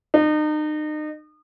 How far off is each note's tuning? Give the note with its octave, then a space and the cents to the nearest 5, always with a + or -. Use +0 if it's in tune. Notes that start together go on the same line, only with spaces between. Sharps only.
D#4 -35